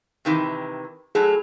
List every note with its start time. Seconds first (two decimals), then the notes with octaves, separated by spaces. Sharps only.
0.25 C3 D#3 E3
1.15 A2 F#3 G#4 A4